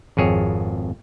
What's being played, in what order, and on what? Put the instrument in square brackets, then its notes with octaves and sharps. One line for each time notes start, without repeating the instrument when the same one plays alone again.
[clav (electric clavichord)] G#1 F2 G#4 C#5